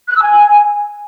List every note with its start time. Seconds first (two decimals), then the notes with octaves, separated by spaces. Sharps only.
0.09 F#6
0.15 E6
0.22 G#5